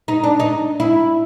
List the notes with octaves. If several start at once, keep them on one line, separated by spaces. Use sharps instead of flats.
D#4
D4
D#4
E4